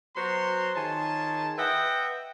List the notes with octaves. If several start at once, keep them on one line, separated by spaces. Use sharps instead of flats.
F#3 B3 F#4 C5 A#5 C6
D#3 F4 G#4 C#5 A5
B4 D#5 E5 F#5 G5